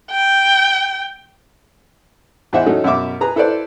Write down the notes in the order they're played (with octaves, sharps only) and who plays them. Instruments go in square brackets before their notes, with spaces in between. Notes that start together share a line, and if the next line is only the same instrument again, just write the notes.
[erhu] G5
[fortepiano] E2 E3 C5 D#5 E5 F#5
F#3 A3 C#4 D#4 A4
F#2 B2 E5 D6
G#4 B4 A#5
E4 A4 B4 C5 D5